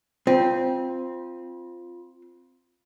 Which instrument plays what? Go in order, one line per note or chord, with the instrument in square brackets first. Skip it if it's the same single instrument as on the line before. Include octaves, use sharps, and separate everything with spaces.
[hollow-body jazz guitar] C4 [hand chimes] F4